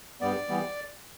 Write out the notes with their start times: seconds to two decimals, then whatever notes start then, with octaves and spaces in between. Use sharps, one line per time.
0.21 G2 G3 B3 D5
0.49 E3 G3 B3